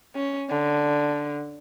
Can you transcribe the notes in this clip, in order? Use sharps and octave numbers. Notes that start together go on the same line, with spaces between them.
C#4
D3